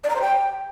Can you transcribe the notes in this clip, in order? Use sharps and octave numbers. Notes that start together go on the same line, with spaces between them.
D5
A#5
C5
G5